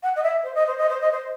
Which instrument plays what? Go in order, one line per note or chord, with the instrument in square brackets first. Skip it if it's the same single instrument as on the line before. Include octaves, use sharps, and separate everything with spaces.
[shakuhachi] F#5
D#5
E5
C5
D#5
C5
D#5
C5
D#5
C5